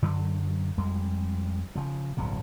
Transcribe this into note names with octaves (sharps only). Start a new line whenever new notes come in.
F#2 D3 F#3
F2 G3 G#3
C#3 F3
D1 B1 G2 C3